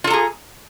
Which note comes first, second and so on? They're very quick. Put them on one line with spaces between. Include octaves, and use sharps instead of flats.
F4 A4 A#5 G#4